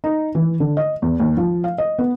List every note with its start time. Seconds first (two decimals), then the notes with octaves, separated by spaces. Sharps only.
0.04 D#4
0.35 E3
0.60 D3
0.77 D#5
1.02 E2
1.20 D#2
1.37 F3
1.64 F5
1.78 D#5
1.99 B3